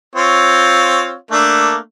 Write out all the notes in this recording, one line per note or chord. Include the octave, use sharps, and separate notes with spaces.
C4 F4 C#5
A3 A#3 D4